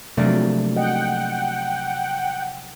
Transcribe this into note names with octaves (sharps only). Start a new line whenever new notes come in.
C3 F3 F#3 A3 A#3 D4
D#5 F#5 G5